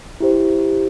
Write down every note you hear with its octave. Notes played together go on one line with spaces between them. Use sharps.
E4 G4 C5